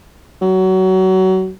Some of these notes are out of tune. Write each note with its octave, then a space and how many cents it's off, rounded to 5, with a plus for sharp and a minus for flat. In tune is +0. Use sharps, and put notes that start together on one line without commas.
F#3 +25